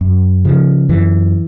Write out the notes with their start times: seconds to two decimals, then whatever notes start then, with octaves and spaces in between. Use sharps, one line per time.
0.01 F#2
0.45 C#3 F3
0.89 F#2 E3